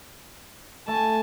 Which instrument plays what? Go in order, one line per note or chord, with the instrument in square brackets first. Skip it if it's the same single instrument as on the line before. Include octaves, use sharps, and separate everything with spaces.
[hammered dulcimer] A3 [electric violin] G#5 A5